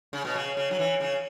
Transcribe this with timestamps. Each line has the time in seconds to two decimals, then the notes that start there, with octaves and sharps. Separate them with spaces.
0.13 C#3
0.25 B2
0.35 C#3
0.57 C#3
0.71 F#3
0.79 E3
1.00 C#3